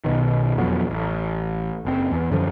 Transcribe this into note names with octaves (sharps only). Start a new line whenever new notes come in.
B1 B2 D#3
E1 F2 F#3 B3
A1
F#1 C4
E2
F#2 D3 F3